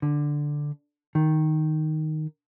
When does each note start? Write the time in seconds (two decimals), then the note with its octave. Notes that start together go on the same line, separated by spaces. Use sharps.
0.02 D3
1.15 D#3